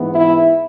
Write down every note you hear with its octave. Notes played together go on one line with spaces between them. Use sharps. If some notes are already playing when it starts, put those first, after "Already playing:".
Already playing: G#2 E3 B3
E4